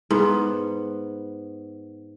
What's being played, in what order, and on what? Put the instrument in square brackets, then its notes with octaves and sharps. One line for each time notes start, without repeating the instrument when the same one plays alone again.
[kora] G#2 B3